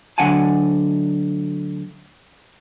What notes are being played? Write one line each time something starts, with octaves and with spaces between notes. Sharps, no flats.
D2 D3 F#3 F#5 G#5 A5